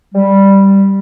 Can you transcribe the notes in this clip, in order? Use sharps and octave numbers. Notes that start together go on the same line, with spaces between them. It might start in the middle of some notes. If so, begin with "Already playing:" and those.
G3